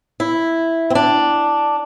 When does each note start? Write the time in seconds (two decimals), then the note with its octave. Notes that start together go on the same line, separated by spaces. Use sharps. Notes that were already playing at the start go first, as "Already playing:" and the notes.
0.20 E4
0.90 C4
0.95 D4